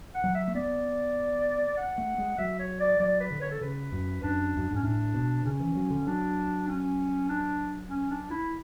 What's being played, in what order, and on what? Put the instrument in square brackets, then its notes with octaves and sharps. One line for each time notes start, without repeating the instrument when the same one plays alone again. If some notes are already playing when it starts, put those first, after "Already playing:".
[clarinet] F#5
[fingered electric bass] F#3
[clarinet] E5
[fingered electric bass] A3
[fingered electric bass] B3 [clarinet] D5
[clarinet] F#5
[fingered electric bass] A3
G#3
[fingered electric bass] F#3 [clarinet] E5
[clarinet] C#5
D5
[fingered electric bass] F#3 [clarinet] D5
[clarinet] B4
[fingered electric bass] D3
[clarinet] C#5
A4
[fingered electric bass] C#3 [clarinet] B4
[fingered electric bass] F#2
[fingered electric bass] F#2 [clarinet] D4
[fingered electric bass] F#2
[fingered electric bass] G#2 [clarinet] C#4
[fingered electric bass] A2 [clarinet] D4
[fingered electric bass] B2
[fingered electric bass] C#3 [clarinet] C#4
[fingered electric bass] E3
F#3
D3
[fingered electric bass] F#3 [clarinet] D4
[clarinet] C#4
D4
C#4
D4
E4